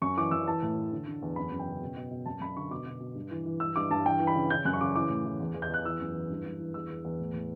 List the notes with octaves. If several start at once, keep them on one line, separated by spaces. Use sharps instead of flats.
F#2 C#6
E3 D6
F#2 E6
E3 A5
A2
E3
D3
D3
E2
F#2 B5
F#2
G5
C#3
B2
B2
B2
F#2 A5
F#2 B5
D3 C#6
B2 D6
B2
B2
G2
E3
E3
G2 E6
G2 D6
G2 A5
E3 G5
E3
B5
C#3
C#3 G6
F#2 F#6
C#6
C#3 D6
E3 D6
A2
E3
E2
E2
G6
E2 F#6
E3 E6
F#2
E3
G2
G2
E3
E2 E6
E2
E2
A2
A2